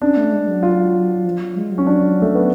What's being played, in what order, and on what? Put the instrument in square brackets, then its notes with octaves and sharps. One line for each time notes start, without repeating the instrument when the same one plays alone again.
[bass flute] C#4 [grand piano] D4
[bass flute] A3
G#3
F#3
[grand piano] F4
[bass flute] F3
F#3
G#3
F#3
[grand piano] C#4
D4
A3
B3